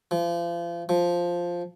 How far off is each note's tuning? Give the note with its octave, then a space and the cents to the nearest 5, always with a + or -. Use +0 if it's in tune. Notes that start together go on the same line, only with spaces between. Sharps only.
F3 -35
F3 +0